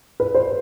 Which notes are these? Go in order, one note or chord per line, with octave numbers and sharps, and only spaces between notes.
B4
C5